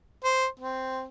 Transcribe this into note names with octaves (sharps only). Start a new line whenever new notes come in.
C5
C4